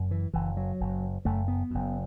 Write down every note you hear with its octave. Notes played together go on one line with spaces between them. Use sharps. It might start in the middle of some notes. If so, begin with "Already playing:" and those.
Already playing: F#1 F#2
E3
F#1 F#2 E3
F#3
F#1 F#2
F#1 F#2 A3
B3
F#1 F#2